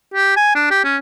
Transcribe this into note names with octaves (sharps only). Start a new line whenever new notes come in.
G4
G#5
D4
G4
C#4